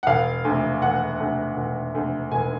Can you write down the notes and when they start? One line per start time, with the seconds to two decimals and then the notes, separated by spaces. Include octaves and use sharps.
0.03 F#5
0.07 E1 F5
0.45 D2 C3
0.82 E1 F#5
1.20 D2 C3
1.57 E1
1.95 D2 C3
2.32 E1 G#5